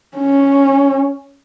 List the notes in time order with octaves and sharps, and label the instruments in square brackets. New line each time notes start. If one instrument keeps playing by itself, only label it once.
[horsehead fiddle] C#4